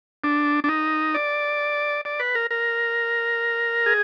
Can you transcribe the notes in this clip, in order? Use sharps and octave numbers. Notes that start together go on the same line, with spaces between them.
D4
D4
D#4
D5
D5
B4
A#4
A#4
G#4